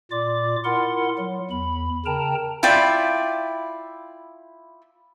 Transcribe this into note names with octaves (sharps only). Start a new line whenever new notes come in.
A#2 F4 D5 D6
E4 F4 A#4 F#5 C6
F#3
E2 B5
C#3 A#4 G5 A5 A#5
E4 F4 D5 G5